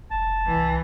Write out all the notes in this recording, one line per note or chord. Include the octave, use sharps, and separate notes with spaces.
F1 A5
C2 E3